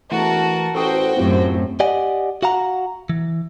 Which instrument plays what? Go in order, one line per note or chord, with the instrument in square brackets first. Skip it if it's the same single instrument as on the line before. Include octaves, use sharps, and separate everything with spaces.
[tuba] E1 [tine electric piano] E3 A3 [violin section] F#4 A#4 A5
[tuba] A1 [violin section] F#4 C5 G5 [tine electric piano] A4 C#6 D#6
[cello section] F#2 A2 A3 [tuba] C4 [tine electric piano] E4 F4 G4
[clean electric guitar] G4 D5 D#5 F#5 G#5
F#4 F5 F#5 A#5
E3